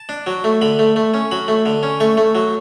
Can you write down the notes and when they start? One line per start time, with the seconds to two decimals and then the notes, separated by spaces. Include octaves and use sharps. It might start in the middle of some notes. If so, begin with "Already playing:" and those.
Already playing: A5
0.09 D4
0.27 F#3
0.44 A3
0.61 D3 B5
0.79 A3
0.96 A3
1.14 C#4
1.31 F#3 B5
1.48 A3
1.66 D3
1.83 C#4
2.00 A3 C#6
2.17 A3
2.35 F#3